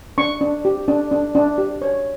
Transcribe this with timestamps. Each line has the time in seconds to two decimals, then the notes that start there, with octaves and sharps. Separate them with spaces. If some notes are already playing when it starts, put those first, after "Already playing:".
0.18 D4 C#6
0.41 D4
0.65 G4
0.88 D4
1.12 D4
1.35 D4
1.58 G4
1.82 C#5